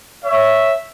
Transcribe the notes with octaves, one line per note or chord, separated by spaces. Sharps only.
C#5 E5